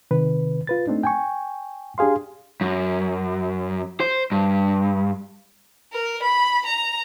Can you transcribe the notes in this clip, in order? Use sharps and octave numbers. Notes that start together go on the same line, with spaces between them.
C3 D#3 B4
F4 B4 A6
A3 C4 D4 D#4
G5 G#5 C#6
D4 G4 G#4 F5 C6
F#2
C5
G2
A#4
B5
A#5